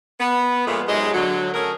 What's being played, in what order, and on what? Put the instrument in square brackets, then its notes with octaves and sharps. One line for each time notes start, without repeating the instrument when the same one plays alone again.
[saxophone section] B3
A#2 F3 G#3 A3 B3
G#2 C3 F#3 G#3
D3 F#3
A3 C#4 G#4 A#4